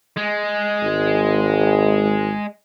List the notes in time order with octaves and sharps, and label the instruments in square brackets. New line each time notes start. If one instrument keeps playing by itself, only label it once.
[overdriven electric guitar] G#3
[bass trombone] G#1